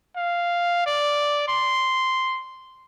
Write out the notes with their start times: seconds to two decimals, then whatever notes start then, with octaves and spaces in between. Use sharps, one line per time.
0.16 F5
0.86 D5
1.48 C6